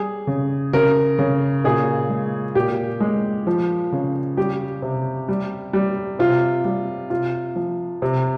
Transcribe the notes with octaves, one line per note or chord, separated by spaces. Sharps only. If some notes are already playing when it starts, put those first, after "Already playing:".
Already playing: G3 G#4
C#3
C#3 A#4
C#3
A#2 G#4
G#3
A#2 G4
G#3
F3
C#3
G3 G4
C3
G3
G3
C3 F4
G3
C3 F4
F3
C3